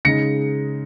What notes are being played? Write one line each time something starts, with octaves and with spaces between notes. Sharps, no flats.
C#3 G#3 D#4 A#6 C#7